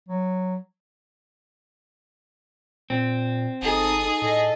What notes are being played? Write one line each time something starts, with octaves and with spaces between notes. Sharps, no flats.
F#3
A#2 C4
G1 D#4 G#4 A4 D#6
A2 A4 D#5